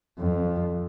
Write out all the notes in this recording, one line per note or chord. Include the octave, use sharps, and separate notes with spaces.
F2